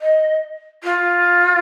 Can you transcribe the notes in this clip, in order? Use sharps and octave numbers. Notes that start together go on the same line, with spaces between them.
D#5
F4